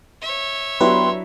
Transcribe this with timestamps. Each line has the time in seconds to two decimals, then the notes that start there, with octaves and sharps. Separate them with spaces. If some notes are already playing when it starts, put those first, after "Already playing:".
0.22 C#5 E5
0.81 F#3 B3 D4 E4 G4 B4 C6